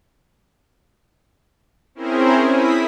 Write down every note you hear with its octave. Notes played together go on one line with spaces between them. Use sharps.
C4 C#4 E4 G#4 A#4 C5
E4 D#6 B6